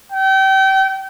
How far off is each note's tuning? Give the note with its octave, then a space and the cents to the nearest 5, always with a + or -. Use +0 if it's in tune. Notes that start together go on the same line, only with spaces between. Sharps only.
G5 -30